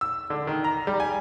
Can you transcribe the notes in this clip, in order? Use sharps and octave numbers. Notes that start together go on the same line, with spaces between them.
E6
D3
D#3
A#5
G3
G#5